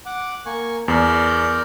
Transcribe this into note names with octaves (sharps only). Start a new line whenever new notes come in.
F#5 D6
A#3 G#5 C#6
E2 A#4 D5 G6